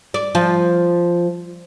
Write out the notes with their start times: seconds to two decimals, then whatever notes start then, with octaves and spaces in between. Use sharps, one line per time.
0.14 D5
0.35 F3